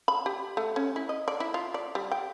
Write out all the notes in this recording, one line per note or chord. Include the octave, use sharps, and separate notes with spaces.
B5
G4
A3
C#4
E4
D#5
D5
E4
F4
D5
G3
G5